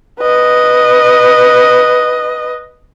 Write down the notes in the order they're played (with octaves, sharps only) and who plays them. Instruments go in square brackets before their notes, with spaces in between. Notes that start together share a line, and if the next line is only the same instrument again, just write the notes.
[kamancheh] B4 D#5